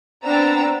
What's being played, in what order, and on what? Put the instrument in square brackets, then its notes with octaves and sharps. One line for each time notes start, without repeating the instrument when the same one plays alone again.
[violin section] B3 C4 D4 A#5 E6 A6